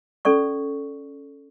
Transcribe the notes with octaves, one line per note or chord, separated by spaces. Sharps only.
C#4 A4 D5 C#6